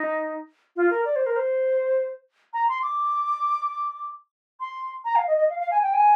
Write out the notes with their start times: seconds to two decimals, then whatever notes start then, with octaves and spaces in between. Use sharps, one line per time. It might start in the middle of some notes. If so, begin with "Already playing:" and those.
Already playing: D#4
0.77 F4
0.91 A#4
1.05 D5
1.16 C5
1.26 A#4
1.36 C5
2.53 A#5
2.69 C6
2.83 D6
4.60 C6
5.05 A#5
5.16 F5
5.27 D#5
5.37 D#5
5.50 F5
5.60 F5
5.71 G#5
5.83 G5
5.94 G#5